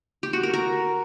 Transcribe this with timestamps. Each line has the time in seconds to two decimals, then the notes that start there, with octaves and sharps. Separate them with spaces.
0.23 G4
0.33 F#4
0.43 A#4
0.54 A#4